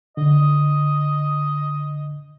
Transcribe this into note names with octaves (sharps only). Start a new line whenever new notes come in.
D3 D#5